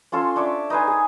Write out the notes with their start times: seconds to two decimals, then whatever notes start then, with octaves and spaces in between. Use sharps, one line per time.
0.12 C#4 F4 A4 C6
0.36 D4 C#5 E5 D6
0.70 D#4 B4 C5 G#5
0.87 G#4